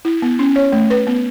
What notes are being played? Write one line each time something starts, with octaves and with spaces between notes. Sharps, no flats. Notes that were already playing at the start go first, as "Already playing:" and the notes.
E4
B3
C#4
C#5
A3
B4
B3